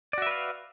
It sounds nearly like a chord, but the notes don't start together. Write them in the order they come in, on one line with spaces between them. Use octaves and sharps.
D5 F#4 E5 B4 F5